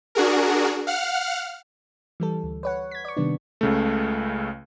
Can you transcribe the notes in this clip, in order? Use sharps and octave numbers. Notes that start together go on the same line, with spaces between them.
D4 F#4 G#4 A#4
F5 F#5 F6
E3 G3 A4
D2
B4 C#5 F#5
G#6 B6
D5 C#6
C3 D#3 G3 B3 D4
C#2 C#3 A3